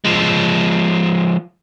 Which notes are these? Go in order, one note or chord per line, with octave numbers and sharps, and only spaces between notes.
F3 G#3